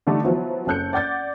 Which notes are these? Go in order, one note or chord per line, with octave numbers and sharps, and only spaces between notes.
D3 G3 A3 D4 D#4
F3 F#3 B3 E4
F#1 C#4 A4 F#6 G6 C#7
D5 F#5 G6 A6